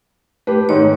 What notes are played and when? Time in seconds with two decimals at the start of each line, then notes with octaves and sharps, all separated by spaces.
0.47 A3 G4 B4
0.69 G#2 D#3 C#5